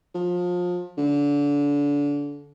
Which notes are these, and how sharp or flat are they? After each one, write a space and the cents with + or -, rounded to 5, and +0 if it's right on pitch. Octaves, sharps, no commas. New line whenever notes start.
F3 +25
D3 -30